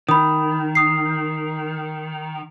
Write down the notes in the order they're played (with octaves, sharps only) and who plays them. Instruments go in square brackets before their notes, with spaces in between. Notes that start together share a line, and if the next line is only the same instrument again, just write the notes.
[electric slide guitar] D#3 [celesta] B5 D#6
[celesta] D#6 C7